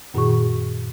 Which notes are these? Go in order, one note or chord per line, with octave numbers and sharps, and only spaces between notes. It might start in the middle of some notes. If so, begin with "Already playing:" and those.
F#2 A#2 D#3 F#4 G#4 C#6